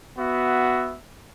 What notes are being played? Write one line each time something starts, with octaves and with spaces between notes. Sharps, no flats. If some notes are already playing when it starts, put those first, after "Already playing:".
B3 F#4 E5